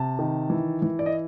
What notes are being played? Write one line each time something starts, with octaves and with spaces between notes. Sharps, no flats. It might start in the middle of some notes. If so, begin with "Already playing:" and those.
Already playing: C3 A5
D#3
E3
E3
D5
D#5